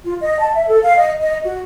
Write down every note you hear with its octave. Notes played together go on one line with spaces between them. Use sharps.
F4
D#5
A5
E5
A4
F5
D#5
D#5
F#4